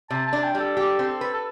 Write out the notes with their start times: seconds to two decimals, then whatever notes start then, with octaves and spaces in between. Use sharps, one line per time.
0.10 C3 A5
0.27 A5
0.33 D4
0.44 G5
0.55 G3
0.60 A4
0.77 G4
0.99 C4
1.21 B4
1.34 A4